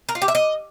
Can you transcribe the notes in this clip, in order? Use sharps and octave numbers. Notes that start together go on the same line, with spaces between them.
A#4
F4
G4
E5
D#5